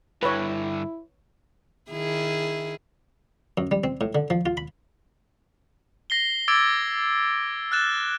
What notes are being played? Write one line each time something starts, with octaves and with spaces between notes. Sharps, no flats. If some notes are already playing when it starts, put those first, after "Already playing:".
G2 D3 E4 B4 C#5
D#3 E4 G#4
F#2
G3
C4
A2
D3
F3
F4
B5
A#6 C7 G7
D6 E6 G#6 A6 D7
F6 F#6 A6 E7